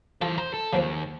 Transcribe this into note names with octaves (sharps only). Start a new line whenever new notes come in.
E3 F4 A4 C5
C5 A#5
A4
D#2 C#3 F3 C4